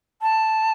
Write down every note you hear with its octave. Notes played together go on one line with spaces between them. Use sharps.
A5